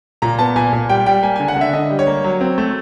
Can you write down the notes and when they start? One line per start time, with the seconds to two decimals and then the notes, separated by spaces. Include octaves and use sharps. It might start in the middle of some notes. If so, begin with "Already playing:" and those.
0.22 A#2 A#5
0.39 B3 A5
0.56 A#2 G#5
0.73 A#2
0.89 G3 G5
1.06 G3 G5
1.23 A#3 G#5
1.36 D3 G#5
1.48 F#5
1.56 D3 E5
1.73 D3 D#5
1.90 G3
1.99 C#5
2.07 A#3
2.24 F#3
2.41 C4
2.58 A3